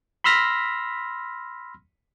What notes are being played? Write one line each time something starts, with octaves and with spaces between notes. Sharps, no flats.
B5 C6 E6 F6 A#6 B6